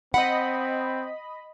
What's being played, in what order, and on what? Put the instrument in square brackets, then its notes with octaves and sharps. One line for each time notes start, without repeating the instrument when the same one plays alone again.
[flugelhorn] C4 [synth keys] D#5 B5 [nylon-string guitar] F#5